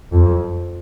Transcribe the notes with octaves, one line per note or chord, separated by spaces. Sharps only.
F2